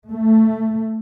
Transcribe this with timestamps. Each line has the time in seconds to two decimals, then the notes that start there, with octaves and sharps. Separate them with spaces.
0.10 A3